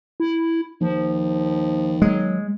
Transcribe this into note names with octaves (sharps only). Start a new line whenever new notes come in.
E4
D#2 F3
F#3 G#3